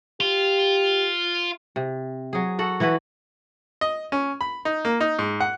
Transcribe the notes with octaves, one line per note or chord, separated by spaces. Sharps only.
F4 G4
C3
F#3 G#4
F#4 A4 F#5
E3 E4 F#4 B4
D#5
C#4
B5
D#4
A#3
D#4
G#2
F#5